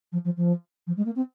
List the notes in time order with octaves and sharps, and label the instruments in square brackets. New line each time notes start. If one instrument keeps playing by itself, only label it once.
[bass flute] F3
F3
F3
F3
G#3
A#3
C4